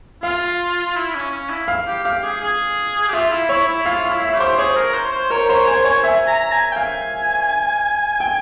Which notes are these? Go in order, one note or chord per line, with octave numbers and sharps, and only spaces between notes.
F4 F5
E4
C#4
C#4
E4
F5
G4
G4 F5
G#4
G#4
G4
F4 E5
E4
E4 C#5
E4
F4 F5
F5
E4
E5
G4
C5
G#4 C#5
A#4
C5
C5
A#4 C#5
C5 C#5
C5 G#5
C#5 G#5
E5 G#5
A#5
G#5
G5
F5 G#5
G5